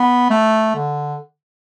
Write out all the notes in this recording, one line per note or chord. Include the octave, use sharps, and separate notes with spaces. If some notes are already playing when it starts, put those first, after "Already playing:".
Already playing: B3
A3
D3